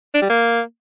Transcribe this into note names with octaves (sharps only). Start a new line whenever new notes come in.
D4
G3
A#3